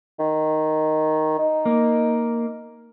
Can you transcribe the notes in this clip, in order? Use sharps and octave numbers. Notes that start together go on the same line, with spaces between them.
D#3
D#4
A#3